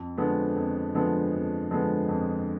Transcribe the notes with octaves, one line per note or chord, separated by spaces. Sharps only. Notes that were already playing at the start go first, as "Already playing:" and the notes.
Already playing: F2
D3 F3 G#3 B3
F2
D3 F3 G#3 B3
F2
D3 F3 G#3 B3
F2